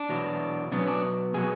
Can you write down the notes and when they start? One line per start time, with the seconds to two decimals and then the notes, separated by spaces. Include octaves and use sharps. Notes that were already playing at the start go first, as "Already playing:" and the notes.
Already playing: D4
0.09 E2 B2 F#3
0.72 B2 F#3 B3 D4
0.79 C#4
0.87 D4
1.34 B2 F#3 B3 G#4